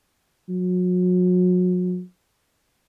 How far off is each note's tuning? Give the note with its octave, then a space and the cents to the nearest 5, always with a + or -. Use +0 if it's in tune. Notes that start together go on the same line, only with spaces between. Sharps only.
F#3 -35